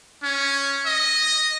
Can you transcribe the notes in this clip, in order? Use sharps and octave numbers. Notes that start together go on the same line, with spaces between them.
C#4
D#5